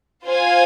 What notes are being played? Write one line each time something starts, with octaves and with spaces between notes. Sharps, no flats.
F4 C5 F5 G#5